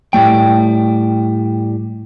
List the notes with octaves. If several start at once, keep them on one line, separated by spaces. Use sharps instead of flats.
A2 G3 A3 G5